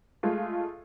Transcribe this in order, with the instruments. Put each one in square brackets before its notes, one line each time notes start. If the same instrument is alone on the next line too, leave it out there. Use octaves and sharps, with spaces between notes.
[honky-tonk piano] G#3 A3 F4